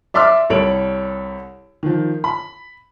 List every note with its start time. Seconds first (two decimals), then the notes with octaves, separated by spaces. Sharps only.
0.14 D5 E5 C6 D6 E6 F6
0.50 C2 G3 A4 C#5 D7 F#7
1.83 D#3 F3
2.24 B5